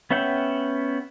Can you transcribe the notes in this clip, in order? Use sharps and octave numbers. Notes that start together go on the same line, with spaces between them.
B3 C#4 E5 F#5 G5